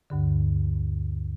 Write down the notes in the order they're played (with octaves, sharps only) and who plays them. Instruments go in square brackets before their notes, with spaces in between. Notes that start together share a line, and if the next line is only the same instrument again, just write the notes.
[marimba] D2 G2 D3